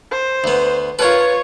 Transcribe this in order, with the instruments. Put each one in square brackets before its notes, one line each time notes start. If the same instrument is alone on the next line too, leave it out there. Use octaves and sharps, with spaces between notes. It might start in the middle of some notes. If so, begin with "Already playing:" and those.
[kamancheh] C5
[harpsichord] D2 B3
[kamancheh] F4 C#5 [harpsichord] A#4 B4